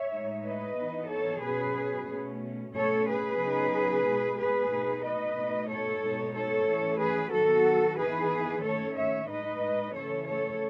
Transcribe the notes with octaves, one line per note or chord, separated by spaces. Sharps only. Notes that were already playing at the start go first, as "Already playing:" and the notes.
Already playing: C#5 E5
A2 G#3 D#4
B4 D#5
E3 B3 D#4
A4 C#5
B2 F#3 C#4 G#4 B4
B2 A3 C#4
B2 A3 C#4 A4 C#5
G#4 B4
C#3 F#3 B3 D#4
B2 G#3 B3
G#4 B4
B2 A3 D#4
B4 D#5
B2 A3 D#4
A4 C#5
B2 G#3 D#4
A4 C#5
E3 A3 C#4
G#4 B4
D#3 F#3 B3 F#4 A4
E3 B3 D#4 G#4 B4
D#3 A3 C#4 A4 C#5
C#5 E5
A2 G#3 D#4 B4 D#5
C#3 E3 A3 C#4 A4 C#5
A4 C#5